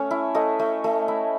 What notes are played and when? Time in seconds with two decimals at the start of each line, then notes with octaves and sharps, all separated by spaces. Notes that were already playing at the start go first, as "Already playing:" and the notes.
Already playing: A3 C#4
0.11 E4
0.35 A3 D#5
0.59 A3
0.84 A3
1.08 E4